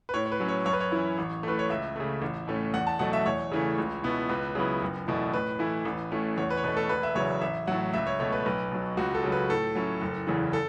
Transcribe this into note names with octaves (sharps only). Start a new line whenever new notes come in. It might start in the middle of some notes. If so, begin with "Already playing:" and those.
B4
A2 C#5
C#5
B4
F#3 C#4
C#5
F#2 C#5
B4
C#5
E3 C#4 E4
A1
A2 A3 B4
C#5
C#2 E5
C#3 A3
A1
A2 A3 C#4
E2 F#5
A5
B2 F#3 A3 F#5
E5
E2 C#5
C#3 E3 A3
C#2
B2 B3 E4
C#2 B4
C#3 F#3 B3 E4
F#1
E2 B2 A3 E4
A2 B4
E3 A3 E4
A1
A2 A3 C#4 E4
E2 C#5
B4
C#5
B2 A3 B4
A4
E1 B4
E5
E2 C#3 F#3 C#5
A1 E5
A2 F#3 F#5
C#2 E5
C#5
B2 A3 C#5
B4
B1 B4
B2 F#3
C#2 F#4
A4
C#3 F#3
B4
A2 A4
F#3 C#4 E4
F#1
E2 C#3 E3
A4